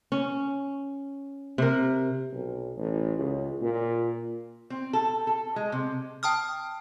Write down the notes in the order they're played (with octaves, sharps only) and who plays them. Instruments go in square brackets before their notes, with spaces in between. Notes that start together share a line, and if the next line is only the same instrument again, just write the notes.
[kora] C#4
C3 A#4
[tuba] B1
A1
C#2
A#2
[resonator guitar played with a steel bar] C4
A4
A4
G#3
C3
[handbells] G5 A5 D#6 F6